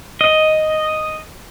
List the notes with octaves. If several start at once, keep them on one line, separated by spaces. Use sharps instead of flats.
D#5